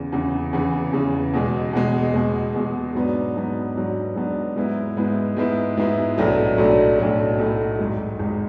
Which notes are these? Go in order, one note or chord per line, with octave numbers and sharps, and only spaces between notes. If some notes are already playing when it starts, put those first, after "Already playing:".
Already playing: E2 C#3 E3
E2 C#3 E3
E2 C#3 E3
E2 C#3 E3
E2 B2 G#3
E2 B2 G#3
E2 B2 G#3
E2 B2 G#3
G#2 F#3 B3 D4
G#2 F#3 B3 D4
G#2 F#3 B3 D4
G#2 F#3 B3 D4
G#2 G#3 B3 E4
G#2 G#3 B3 E4
G#2 G#3 B3 E4
G#2 G#3 B3 E4
B1 A2 F#3 A3 D4
B1 A2 F#3 A3 D4
B1 A2 F#3 A3 D4
B1 A2 F#3 A3 D4
G#1 G#2 G#3
G#1 G#2 G#3